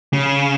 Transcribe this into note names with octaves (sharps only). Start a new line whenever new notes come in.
C#3